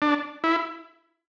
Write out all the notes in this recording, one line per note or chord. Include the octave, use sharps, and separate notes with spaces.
D4
E4